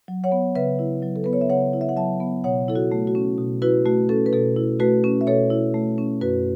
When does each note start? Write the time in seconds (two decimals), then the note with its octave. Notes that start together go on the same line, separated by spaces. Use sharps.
0.08 F#3
0.24 C#5 F#5
0.32 B3
0.55 C#3 B4 E5
0.79 E4
1.02 F#3
1.16 A4
1.24 B3 B4
1.33 C#5
1.41 E5
1.50 C#3 C#5 F#5
1.73 E4
1.81 E5
1.89 F#5
1.97 F#3 E5 A5
2.20 B3
2.44 B2 C#5 F#5
2.68 E4 A4
2.76 F#4
2.92 A3
3.07 F#4
3.15 C#4
3.38 B2
3.62 E4 F#4 B4
3.86 A3 F#4
4.09 C#4 A4
4.26 B4
4.33 B2 A4
4.57 E4
4.80 A3 F#4 B4
5.04 C#4
5.21 E5
5.27 B2 A4 C#5
5.50 E4
5.74 A3
5.98 C#4
6.21 F#2 F#4 B4